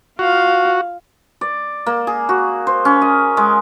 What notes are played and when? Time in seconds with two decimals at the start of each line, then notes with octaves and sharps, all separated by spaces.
0.19 F4 F#4 F5
1.41 D5
1.86 A#3
2.07 G#4
2.29 F#4
2.67 C5
2.85 C#4
3.02 D#5
3.37 G#3